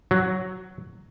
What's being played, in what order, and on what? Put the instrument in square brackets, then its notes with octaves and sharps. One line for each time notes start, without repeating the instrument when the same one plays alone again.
[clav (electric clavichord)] F#3